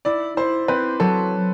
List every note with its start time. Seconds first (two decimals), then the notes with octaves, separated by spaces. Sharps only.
0.05 E4 D5
0.37 E4 C5
0.68 C4 B4
1.00 F#3 A4